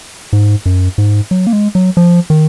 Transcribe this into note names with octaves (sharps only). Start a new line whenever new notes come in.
G#2
F#2
G#2
F#3
A#3
G#3
F#3
F3
D#3